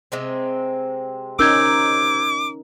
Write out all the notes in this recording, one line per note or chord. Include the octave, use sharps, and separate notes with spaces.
C3 G#3 C4
C#4 D#4 A#4 D6 E6 G6 G#6